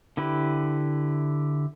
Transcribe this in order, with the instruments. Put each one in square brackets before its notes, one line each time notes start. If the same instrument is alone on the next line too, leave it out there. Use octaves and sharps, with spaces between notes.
[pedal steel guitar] D3 E4 G4 B4